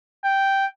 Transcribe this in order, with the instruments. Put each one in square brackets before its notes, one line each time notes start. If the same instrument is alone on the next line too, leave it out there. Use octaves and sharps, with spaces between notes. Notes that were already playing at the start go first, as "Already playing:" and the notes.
[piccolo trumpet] G5